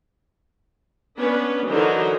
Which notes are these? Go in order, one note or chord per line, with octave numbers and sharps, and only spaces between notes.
B3 C#4 D4 B4
D3 E3 F#3 D#4 A#4 C5